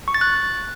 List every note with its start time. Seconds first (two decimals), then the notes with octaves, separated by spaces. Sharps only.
0.08 C#6
0.14 A6
0.21 F#6